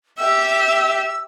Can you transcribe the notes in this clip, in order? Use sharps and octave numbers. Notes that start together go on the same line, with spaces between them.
G4 E5 E6